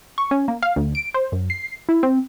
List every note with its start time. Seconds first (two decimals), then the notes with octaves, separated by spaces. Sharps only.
0.18 C#6
0.31 C#4
0.48 A#3
0.63 F5
0.76 D2
0.95 D7
1.14 C5
1.32 F#2
1.50 C7
1.89 E4
2.03 C4